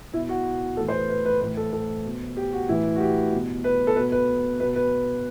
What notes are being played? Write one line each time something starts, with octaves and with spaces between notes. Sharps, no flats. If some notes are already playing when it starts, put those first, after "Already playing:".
B2 E4
F#4
A2 E3 A4
C5
B4
B4
B4
A2 E3 B4
A4
A4
B2
G4
F#4
A2 E3 E4
F#4
G4
B2
B4
A4
B2 B4
B4
B2 B4
B4